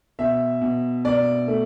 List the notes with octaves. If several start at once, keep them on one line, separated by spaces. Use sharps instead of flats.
B2 E5
B2
B2 D5
A3